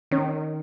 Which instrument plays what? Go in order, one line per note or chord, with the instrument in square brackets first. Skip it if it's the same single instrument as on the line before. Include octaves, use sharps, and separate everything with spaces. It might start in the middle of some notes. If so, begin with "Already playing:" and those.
[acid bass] D#3 [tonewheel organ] C#4